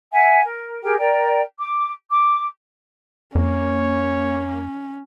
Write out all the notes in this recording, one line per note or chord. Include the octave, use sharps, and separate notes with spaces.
E5 F#5 G#5
A#4
G4 G#4 A#4 G5
A#4 D5 G5 A#5
D6
D6
F2 A#3 C#4 C#5